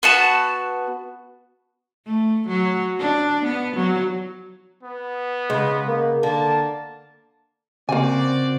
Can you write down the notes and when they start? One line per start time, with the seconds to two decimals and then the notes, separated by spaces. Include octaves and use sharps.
0.03 B3 F#4 A5
2.06 A3
2.48 F#3
2.99 D4
3.45 B3
3.76 F#3
4.83 B3
5.50 C#3 G#3
5.88 A#3
6.23 D3 A#3 A5
7.89 C#3 A#3 C4 F#4 C5 D5 G#5